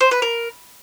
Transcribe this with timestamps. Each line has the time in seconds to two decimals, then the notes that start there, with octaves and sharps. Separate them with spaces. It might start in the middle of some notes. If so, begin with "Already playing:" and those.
0.01 C5
0.11 B4
0.22 A#4